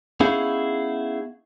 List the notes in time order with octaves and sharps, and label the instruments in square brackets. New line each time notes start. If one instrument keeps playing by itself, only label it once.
[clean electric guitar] B3 C#4 D#4 E4 G#4 F5